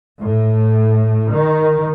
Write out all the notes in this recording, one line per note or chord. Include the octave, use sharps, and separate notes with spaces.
A2
D#3